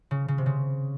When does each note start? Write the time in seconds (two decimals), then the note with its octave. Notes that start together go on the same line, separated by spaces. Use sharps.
0.11 C#3
0.28 C#3
0.38 C3
0.46 C#3